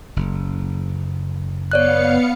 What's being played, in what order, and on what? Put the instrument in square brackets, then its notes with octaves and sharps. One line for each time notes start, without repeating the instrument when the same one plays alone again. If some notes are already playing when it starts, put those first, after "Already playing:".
[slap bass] F#1
[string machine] B3 F5 C#7 [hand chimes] C#5 D5 F#6